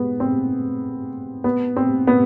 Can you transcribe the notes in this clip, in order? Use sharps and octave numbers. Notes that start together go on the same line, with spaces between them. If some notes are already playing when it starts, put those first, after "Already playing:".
Already playing: G#3 B3
C4
B3
C4
B3